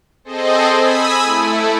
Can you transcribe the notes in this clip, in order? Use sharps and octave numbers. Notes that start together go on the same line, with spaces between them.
C4 G#4 A4 C5 D#5
G#5 B5 D#6 E6
A3 E4